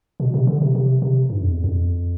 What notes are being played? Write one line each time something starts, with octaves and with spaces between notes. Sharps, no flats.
B2
C3
D3
C3
C3
C3
G2
F2
E2
F2